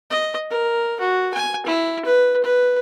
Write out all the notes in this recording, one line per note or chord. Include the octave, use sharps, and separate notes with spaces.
D#5
A#4
F#4
G#5
E4
B4
B4